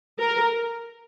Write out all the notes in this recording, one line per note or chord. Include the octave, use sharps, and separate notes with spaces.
A#4